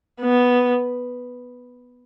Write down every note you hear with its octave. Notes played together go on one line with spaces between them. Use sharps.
B3